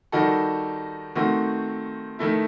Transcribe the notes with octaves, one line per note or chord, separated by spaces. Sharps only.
D#3 G3 D#4 F#4 A4
D#3 A3 C4 F#4
D#3 A3 E4